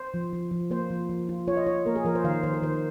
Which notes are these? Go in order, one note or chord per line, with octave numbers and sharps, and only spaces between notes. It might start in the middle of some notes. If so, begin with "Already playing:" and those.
Already playing: C5
F3
F3
F3
A#3 C5
F3
F3
F4
F4 C#5
D#5
F4 C#5
A#3 A#4
G#4
F3 A#4
C5
D#3 F5
D#3 C5
A#4
D#3 C5